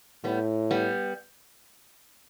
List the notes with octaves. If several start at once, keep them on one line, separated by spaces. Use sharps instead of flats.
A2 G3 B3
G3 B3